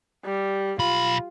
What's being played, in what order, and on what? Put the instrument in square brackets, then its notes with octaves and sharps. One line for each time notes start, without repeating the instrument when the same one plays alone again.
[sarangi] G3
[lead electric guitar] B1 B5 [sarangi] F4